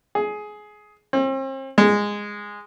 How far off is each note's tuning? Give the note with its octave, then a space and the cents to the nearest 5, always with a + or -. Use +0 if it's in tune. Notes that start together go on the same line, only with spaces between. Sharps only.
G#4 +15
C4 +40
G#3 -10